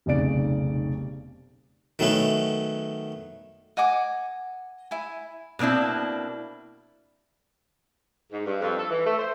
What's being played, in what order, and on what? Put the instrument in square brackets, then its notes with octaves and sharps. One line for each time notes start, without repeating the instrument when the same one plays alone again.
[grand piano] F1 B1 C#3 D5 D7
[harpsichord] D#3 F#3 A3 B3 C#4
[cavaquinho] D#5 F#5 G#5 D6
E4 G#5
[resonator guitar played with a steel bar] B2 A#3 C4 D4 E4
[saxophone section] G#2
G2
F2
A4
E3
A3
C5